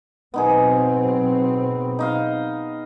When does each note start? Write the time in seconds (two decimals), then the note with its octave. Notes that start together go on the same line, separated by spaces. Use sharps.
0.34 B2 F#3 B3 C4 D#4 G#4
1.99 D#4 D#5 F5